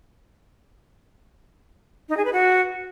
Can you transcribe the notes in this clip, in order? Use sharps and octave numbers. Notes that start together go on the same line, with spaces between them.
D#4
G#4
B4
F#4